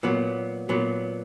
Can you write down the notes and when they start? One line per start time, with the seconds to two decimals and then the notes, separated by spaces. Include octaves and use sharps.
0.03 A#2 F#3 B3
0.69 A#2 F#3 B3